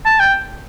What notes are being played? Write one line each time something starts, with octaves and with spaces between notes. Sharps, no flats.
A5
G5